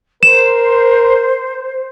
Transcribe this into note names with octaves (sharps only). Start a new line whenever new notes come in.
A#4 C5 E7